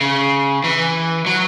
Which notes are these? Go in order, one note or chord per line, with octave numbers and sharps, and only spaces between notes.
C#3
E3
F#3